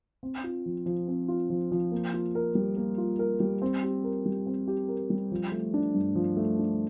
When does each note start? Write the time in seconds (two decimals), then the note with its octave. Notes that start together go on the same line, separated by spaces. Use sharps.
0.23 C4
0.44 F4
0.66 F3
0.86 F3
1.08 C4
1.28 F4
1.50 F3
1.71 F3
1.92 A#3
2.14 F4
2.35 A#4
2.55 G3
2.77 A#3
2.98 F4
3.19 A#4
3.40 G3
3.62 C4
3.83 G4
4.04 A#4
4.26 G3
4.46 C4
4.68 G4
4.89 A#4
5.10 G3
5.31 F3
5.52 A3
5.74 D4
5.94 G2
6.15 F3
6.37 A3
6.59 D4